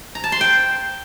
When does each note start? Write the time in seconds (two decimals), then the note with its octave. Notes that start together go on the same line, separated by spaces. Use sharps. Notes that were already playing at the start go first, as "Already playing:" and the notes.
0.15 A#5
0.24 A5
0.32 C6
0.41 G5